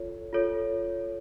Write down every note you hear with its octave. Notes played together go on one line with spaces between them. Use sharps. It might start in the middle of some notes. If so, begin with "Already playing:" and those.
Already playing: F4 A4 C#5
F4 A4 C#5